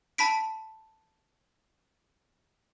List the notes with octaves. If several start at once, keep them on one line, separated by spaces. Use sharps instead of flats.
A5 B5 B6 D7